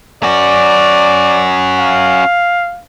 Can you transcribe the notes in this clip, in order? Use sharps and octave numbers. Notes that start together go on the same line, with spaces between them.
C#4 F#4 D5
F5